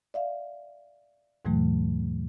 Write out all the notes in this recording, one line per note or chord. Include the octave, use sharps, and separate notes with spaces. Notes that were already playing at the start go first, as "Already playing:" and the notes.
D5 E5 F5
D#2 G#2 B2 E3 F#3 A3